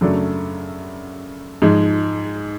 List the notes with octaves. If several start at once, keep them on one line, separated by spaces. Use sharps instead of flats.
F#2 C#3 F#3 A3 D4
G#2 F3 G#3